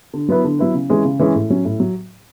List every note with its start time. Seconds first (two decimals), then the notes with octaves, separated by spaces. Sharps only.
0.14 D3
0.29 F#3 B3 E4 B4
0.44 D3
0.59 F#3 B3 E4 B4
0.74 C#3
0.90 E3 G#3 C#4 G#4
1.05 C#3
1.19 E3 G#3 C#4 G#4
1.35 A2
1.50 F#3 C#4
1.65 A2
1.80 F#3